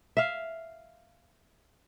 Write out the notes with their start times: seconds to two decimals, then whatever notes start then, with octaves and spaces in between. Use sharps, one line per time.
0.17 E5 F5